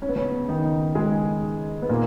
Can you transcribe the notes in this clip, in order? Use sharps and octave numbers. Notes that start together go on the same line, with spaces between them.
C#4
B3
C#3 C#4
D#3 D#4
G#3 G#4
B3
A#2 A#3